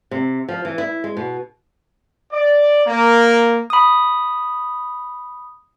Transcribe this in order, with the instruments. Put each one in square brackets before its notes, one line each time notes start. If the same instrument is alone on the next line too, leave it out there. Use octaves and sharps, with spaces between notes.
[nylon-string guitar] C3
F3
E3
E4
G#3
B2
[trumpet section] D5
A#3
[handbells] B5 D#6